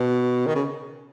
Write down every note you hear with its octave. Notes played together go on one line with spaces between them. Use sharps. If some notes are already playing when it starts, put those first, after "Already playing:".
Already playing: B2
D#3
C#3